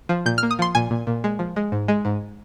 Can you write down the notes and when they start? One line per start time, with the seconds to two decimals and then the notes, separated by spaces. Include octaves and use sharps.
0.09 F3
0.26 A#2 G6
0.38 F6
0.43 A#3
0.51 D#6
0.59 F3 C6
0.75 A#2 G#5
0.91 A#2
1.07 A#2
1.24 G#3
1.39 F3
1.56 G#3
1.72 G#2
1.88 G#3
2.05 G#2